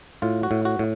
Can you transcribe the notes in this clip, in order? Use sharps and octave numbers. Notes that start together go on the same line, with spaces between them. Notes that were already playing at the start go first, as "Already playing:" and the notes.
A2 F4
F#4
A2
F#4
A2